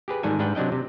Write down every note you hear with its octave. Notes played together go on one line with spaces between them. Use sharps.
G4 G#4 B4
G#2 D#3 G3 A4 G#5
G#2 G3 D4 B4 F#5 G5
C3 F#3 D4 D#5 G5
C3